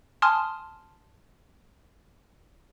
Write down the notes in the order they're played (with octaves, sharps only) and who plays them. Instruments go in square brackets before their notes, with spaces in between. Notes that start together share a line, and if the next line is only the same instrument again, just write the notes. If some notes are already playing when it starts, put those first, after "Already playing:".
[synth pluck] G#5 A5 C6 D#6 F6